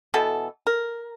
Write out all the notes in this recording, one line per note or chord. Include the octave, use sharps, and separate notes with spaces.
B2 E3 B3 A4
A#4